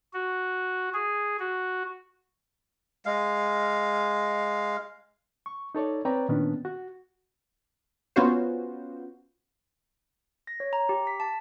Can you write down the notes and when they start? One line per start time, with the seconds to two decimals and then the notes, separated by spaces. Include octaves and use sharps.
0.13 F#4
0.94 G#4
1.39 F#4
3.06 G#3 F5
5.46 C#6
5.75 D#4 A4 C#5 D5
6.05 C4 B4 C#5 D5 G5 A#5
6.29 A#2 D#3 B3 C#4 D4
6.65 F#4
8.16 B3 C#4 F4 F#4 C5
10.47 A#6
10.60 C#5
10.73 A#5
10.89 G4
11.07 B6
11.20 A5